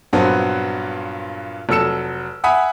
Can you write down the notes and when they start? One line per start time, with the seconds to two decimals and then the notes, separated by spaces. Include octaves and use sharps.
0.13 G2 A#2 F#3 B3 C4
1.69 F1 F#3 A4 E6 C#7 E7
2.44 E5 F#5 G#5 B5 D#6